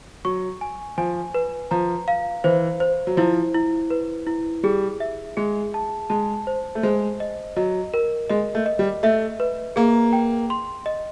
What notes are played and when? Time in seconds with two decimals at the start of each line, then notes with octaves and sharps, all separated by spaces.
0.25 F#3 C#6
0.61 G#5
0.98 F3 G#5
1.34 B4
1.71 F3 A#5
2.08 F5
2.44 E3 C5
2.80 C5
3.07 F#3
3.17 F3 E4
3.55 E4
3.90 B4
4.27 E4
4.63 G3 G#4
5.00 E5
5.37 G#3 G#4
5.74 A5
6.10 G#3 A5
6.47 C5
6.75 A3
6.83 G#3 C5
7.20 D#5
7.56 F#3 D#5
7.94 A#4
8.30 G#3 D#5
8.55 A3
8.66 D#5
8.79 G3
9.03 A3 E5
9.40 B4
9.76 A#3 G#4
10.13 G5
10.50 C6
10.86 D#5